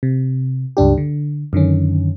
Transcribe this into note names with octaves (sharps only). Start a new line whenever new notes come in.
C3
C#2 G2 D4 G4
D3
F#2 D3 D#3 C#4